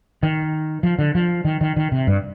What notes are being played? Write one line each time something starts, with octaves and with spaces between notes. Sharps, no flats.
D#3
F3
D3
F3
D#3
D#3
D#3
C3
G2